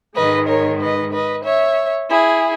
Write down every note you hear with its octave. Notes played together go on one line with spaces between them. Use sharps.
G#2 D#3 G#3 B4 D#5
A#4 C#5
B4 D#5
B4 D#5
C#5 E5
E4 G#4